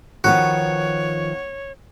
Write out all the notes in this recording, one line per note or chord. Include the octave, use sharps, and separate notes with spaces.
D#3 F3 B3 F#4 C#5